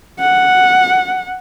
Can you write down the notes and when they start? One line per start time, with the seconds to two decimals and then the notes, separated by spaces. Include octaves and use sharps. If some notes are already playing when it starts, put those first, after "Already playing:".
0.20 F#5